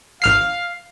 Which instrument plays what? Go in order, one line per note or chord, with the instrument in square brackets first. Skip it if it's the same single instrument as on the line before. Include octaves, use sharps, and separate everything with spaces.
[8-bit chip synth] G#1 F6 C7 [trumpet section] F5